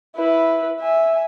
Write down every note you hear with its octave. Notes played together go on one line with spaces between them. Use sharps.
E4 B4
E5 G#5